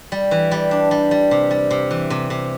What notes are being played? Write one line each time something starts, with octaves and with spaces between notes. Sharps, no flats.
G3
E3
G3
D4
G3
G3
C3
G3
C3
E3
C3
C3